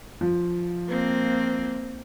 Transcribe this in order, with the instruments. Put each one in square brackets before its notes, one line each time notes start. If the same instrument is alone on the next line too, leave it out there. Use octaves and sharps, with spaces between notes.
[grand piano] F3
[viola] A#3 C4